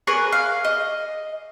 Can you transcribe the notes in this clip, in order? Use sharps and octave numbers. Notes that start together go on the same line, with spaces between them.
G#4 A#4 B4 C#5
F5
D#5